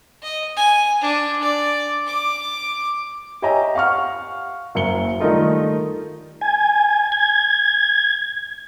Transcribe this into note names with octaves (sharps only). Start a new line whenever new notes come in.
D#5
G#5
D4
D5
D6
G4 C#5 D#5 E5 G#5 A#5
F5 F#5 C#6 F6
F#1 F#2 A#3 C#7 G7
D#3 G3 A3 D#4 F4 A#4
G#5
G#6